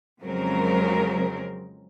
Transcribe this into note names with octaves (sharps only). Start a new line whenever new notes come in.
F2 C#3 F#3 G#3 C4 A#4